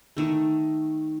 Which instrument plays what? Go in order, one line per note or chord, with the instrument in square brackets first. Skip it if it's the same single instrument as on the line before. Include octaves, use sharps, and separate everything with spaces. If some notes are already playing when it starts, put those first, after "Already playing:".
[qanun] D#3 A3